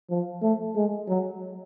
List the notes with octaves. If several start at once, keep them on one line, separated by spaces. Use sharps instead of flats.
F3
A3
G#3
F#3